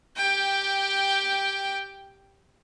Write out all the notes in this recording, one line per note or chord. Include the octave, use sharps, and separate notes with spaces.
G4 G5